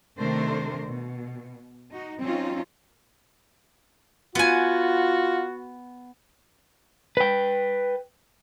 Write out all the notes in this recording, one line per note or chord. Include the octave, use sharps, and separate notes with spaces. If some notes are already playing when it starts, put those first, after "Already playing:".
C3 D#3 A3 D4 A#4 C5
B2
D#4 F#4
F#3 C4 C#4 D#4 F4
B3 F4 F#4 G#5
B4 G5